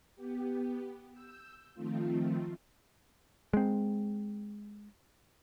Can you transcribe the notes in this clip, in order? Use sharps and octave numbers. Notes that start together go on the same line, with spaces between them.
B3 G4
E6 G6
D#3 F3 A3 C4 F4
G#3 C4